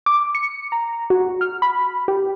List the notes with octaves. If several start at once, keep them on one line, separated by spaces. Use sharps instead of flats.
D6
C#7
A#5
F#4
F6
B5
G4